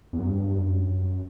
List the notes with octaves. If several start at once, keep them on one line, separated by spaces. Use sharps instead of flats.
E2
F#2
G2
F#2
F#2